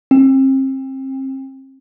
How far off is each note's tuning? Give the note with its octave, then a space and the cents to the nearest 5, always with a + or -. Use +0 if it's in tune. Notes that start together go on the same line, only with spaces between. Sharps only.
C4 +35